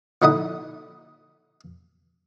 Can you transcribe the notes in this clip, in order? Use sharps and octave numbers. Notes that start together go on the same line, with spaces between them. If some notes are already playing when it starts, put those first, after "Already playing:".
A#1 D3 D#4 E4 F#5 D#6